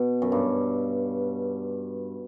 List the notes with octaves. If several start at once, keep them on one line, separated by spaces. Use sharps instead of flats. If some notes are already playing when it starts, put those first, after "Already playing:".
Already playing: B2
F#2
G2